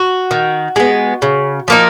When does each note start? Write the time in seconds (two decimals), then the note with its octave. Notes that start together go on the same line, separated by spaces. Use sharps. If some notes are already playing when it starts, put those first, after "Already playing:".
Already playing: F#4
0.31 D#3
0.76 G#3 B3
1.22 C#3
1.68 F3 A#3 D#4